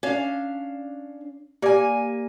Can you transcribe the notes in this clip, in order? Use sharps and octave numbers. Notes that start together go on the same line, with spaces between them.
C#4 D4 F5
A#3 G4 D5 G#5 D6